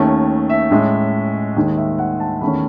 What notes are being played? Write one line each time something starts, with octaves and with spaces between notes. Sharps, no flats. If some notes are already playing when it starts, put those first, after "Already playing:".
Already playing: D#2 D#3 A3 C#4
E5
A2 G#3 C#4
D#2 D#3 G#3
E5
F#5
A5
E2 D#3 A3 C#4 B5